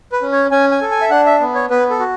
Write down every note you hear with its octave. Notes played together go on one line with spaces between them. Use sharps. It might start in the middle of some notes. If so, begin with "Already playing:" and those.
B4
C#4
C#5
C#4 G#5
G#5
A4
G#5
E5
D4 F#5
E5
B3
C#5
B3 B4
A4
F#4